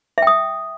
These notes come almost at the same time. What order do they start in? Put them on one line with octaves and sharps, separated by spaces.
E5 G5 D#6